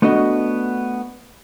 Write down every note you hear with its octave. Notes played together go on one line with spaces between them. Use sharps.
A3 B3 D4 F#4 D#5